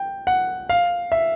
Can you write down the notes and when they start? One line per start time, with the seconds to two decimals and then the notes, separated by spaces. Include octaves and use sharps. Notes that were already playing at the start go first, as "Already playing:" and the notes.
Already playing: G5
0.27 F#5
0.70 F5
1.12 E5